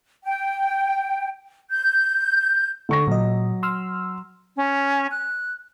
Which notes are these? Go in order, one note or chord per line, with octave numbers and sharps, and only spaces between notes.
G5
G6
D3 C#6 A#6
A#2 F#3 D#5
C6 E6 F6
C#4
F#6